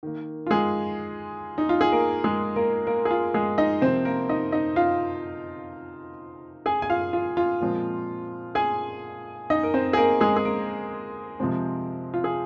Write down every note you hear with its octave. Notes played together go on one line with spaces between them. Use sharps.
D#3 A#3
F4
G#3 G#4
D#4
F4
G#4
A#3 A#4
G#3 G#4
A#3 A#4
A#3 A#4
G#4
F4
G#3 G#4
D#4 D#5
C3 F3 A#3 C4 C5
A#3 A#4
D#4 D#5
D#4 D#5
F4 F5
G#4 G#5
G#5
F4 F5
F4
F4
A#2 F3 G#3 C4
G#4 G#5
D#4 D#5
A#4
C4 C5
G#4
A#3 A#4
G#3 G#4
G#4
A#3 A#4
C3 F3 G#3 C4
F4
G#4